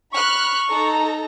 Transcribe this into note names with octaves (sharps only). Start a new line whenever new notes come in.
B5 C#6 F6 F#6
D#4 A4 A#5